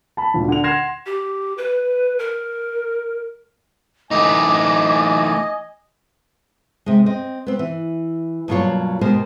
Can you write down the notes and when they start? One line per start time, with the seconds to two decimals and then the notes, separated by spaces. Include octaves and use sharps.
0.17 A5 B5
0.34 D2 A#2
0.48 D3 F7
0.63 F#5 C6 G#6 A#6 C7 E7
1.06 G4
1.58 B4
2.19 A#4
4.11 E3 A3 D#4 D#5 G#5 D6
6.86 C3 G#3
7.06 C4 D#5
7.47 B3 C4
7.59 E3
8.48 G2 B2 F#3 A#3 F4 C#5
9.01 B2 G#3 B3 G4 A#4 C5